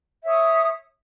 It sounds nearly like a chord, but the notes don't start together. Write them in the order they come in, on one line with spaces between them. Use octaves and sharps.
E5 C#5 D#6